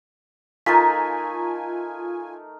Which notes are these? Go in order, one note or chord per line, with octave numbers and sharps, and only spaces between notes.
A3 D#4 F4 A#4 G#5 A#5 A6 B6